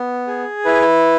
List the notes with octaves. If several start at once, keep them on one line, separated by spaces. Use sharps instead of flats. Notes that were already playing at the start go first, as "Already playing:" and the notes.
Already playing: B3
G#4
E4 B4